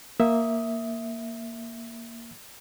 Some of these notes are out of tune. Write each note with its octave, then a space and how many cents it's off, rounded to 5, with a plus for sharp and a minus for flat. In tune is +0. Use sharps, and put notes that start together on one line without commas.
A#3 +0 E5 +0 D#6 +15